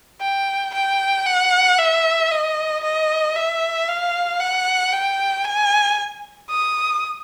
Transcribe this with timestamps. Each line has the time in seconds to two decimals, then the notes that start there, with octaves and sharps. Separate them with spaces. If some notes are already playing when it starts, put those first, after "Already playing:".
0.21 G5
0.74 G5
1.26 F#5
1.78 E5
2.31 D#5
2.83 D#5
3.36 E5
3.88 F5
4.40 F#5
4.93 G5
5.45 G#5
6.50 D#6